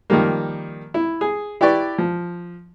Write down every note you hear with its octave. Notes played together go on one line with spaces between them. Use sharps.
D#3 F3 G3 A#3
E4
G#4
E4 G4 B4 D5 C#6
F3